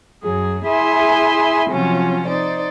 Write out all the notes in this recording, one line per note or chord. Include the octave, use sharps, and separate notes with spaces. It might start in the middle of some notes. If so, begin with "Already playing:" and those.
F#2 F#3 G#4
E4 G#4 E5 G#5 C6
C3 F3 F#3 C#4 F4
D#4 C5 D5